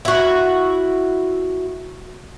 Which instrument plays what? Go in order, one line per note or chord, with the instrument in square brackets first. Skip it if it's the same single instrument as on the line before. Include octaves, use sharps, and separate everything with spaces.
[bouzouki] E4 F#4